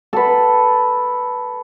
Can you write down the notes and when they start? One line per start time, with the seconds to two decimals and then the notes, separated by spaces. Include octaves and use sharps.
0.13 A4 B4